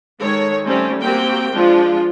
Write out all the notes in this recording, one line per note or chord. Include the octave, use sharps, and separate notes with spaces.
D#3 G#3 A4 C#5
G3 A3 C4 C#4
A#3 C4 F#4 G4 G5
F3 G#3 D4 F4